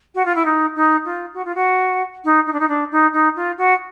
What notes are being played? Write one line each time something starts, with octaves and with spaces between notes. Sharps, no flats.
F#4
F4
E4
D#4
D#4
F4
F#4
F4
F#4
D#4
D#4
D4
D#4
D4
D#4
D#4
F4
F#4